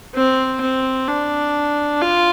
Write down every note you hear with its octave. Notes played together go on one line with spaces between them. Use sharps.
C4
C4
D4
F4